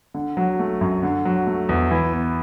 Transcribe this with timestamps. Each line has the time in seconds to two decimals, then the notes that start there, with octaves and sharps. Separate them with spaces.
0.14 D3
0.37 F#3
0.59 A3
0.81 F#2
1.03 D3
1.25 F#3
1.47 A3
1.69 E2
1.91 E3
2.13 B3